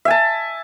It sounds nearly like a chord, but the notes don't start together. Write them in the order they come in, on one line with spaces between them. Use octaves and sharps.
E5 G#5 A5